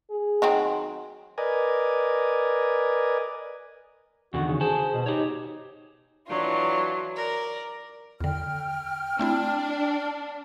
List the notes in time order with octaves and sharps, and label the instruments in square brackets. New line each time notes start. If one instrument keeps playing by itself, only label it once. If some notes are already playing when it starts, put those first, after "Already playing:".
[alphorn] G#4
[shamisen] D#3 F#3 C4
[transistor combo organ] A#4 B4 D5 D#5 G#5
[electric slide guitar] E2 D3 D#3 [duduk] F#4
[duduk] C#3
[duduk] G#4 [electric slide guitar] C5 A5
[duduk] B2
[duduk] D#4 [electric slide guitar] G4 C#5
[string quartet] E3 F#3 D4 F4
A#4 D5
[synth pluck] E2 D3 [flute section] G5 F6
[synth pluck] A3 C4 E4 [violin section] D4